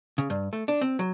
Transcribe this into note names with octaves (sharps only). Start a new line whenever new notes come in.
C#3
G2
A3
D4
C4
F#3